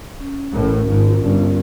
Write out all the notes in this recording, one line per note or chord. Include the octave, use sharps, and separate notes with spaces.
C#4
A1 A2 A#4
G#1 G#2 F4
G1 G2 C#4